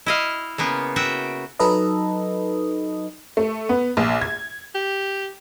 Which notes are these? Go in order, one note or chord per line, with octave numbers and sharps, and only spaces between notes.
E4 D#5 F5
C#3 A#3 B3
F#4 E5 G5
F#3 D#4 A4 B4 D#5
A3
B3
A#1
G#6
G4